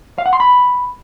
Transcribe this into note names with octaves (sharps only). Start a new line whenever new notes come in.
F5
F#5
C6
B5